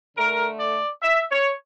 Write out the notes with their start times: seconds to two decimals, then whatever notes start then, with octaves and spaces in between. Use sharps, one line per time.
0.16 D3 A3 A#4
0.59 D5
1.02 E5
1.31 C#5